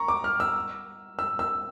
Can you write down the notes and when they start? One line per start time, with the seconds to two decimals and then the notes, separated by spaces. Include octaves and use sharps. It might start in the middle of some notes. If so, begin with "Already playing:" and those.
Already playing: A#5 C#6
0.08 D6
0.24 F6
0.40 E6
1.19 E6
1.39 E6